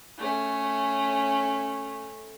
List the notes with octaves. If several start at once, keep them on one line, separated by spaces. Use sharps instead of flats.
A3 C#4